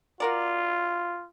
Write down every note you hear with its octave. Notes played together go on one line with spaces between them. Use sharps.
F4 F#4 A#4 D5